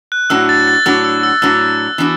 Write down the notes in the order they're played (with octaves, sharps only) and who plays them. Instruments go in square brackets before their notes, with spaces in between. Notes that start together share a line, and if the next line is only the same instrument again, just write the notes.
[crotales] F#6
[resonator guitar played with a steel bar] A2 F#3 D4 F#4 [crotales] E6
[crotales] A6
A6
[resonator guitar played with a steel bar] A2 F#3 D4 F#4 [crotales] E6
[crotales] E6
E6
[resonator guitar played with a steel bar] A2 F#3 D4 F#4 [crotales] E6
[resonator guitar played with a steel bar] E3 B3 D4 F#4